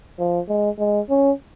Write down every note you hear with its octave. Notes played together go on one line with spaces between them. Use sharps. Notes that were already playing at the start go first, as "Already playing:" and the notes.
F3
G#3
G#3
C#4